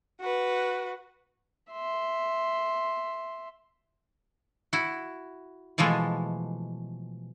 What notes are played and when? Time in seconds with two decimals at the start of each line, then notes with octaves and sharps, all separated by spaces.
0.20 F#4 B4
1.71 E5 C6
4.73 E4 F#4
5.78 B2 E3 F3 G#3 A3